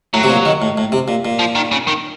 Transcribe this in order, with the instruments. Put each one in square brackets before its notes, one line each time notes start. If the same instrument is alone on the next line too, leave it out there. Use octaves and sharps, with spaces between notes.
[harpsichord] A2 [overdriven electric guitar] F#3
[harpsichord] C3
A#2
D#3
A2
A2
C3
A#2
A#2
[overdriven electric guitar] F3
D#3
C#3
D#3